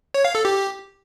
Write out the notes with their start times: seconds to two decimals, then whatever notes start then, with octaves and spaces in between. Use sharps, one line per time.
0.14 C#5
0.25 F5
0.35 A4
0.45 G4